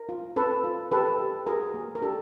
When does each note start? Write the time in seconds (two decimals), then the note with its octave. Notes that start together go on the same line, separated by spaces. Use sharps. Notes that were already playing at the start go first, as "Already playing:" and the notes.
Already playing: A#4
0.09 F4
0.36 C4 A4 B4
0.64 F4
0.91 G4 A4 B4
1.19 G4
1.46 F#4 G#4 A#4
1.74 A#3
1.95 A#4
2.02 D4 G4 A4